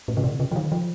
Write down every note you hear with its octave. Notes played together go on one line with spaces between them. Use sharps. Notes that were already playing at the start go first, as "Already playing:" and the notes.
A2
C#3
C3
C#3
F3
D#3
F3